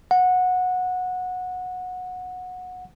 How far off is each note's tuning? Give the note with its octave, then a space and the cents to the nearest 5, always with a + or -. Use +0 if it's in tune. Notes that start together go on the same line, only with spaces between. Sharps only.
F#5 -20